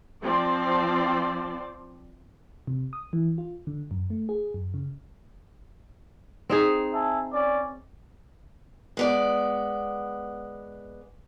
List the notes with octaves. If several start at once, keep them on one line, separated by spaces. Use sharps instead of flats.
F3 C4 C5 D5
C3
D#6
E3
F4
D3
F#2
A3
G#4
F#2
C#3
C4 D#4 G#4
E5 G#5 A5
C#4 D5
G#3 B3 D5